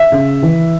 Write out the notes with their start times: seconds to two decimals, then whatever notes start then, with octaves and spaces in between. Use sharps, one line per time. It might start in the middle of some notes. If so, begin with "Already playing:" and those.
Already playing: E5
0.12 C#3
0.43 E3